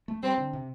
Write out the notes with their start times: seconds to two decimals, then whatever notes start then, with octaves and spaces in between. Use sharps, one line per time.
0.08 A3
0.23 G3 C4
0.38 D3
0.53 C3